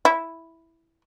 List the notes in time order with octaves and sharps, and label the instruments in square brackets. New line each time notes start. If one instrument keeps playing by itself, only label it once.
[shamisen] E4